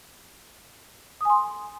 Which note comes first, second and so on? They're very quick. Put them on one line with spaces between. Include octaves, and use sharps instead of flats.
D#6 G#5 C6